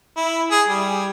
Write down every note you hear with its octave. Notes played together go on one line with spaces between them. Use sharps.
E4
G#4
G3